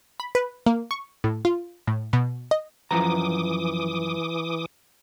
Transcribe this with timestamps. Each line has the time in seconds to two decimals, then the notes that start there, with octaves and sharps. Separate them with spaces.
0.20 B5
0.35 B4
0.66 A#3
0.91 C#6
1.24 A2
1.45 F4
1.87 A2
2.13 B2
2.51 D#5
2.91 F#2 E3 F3 A#5 D6 D#6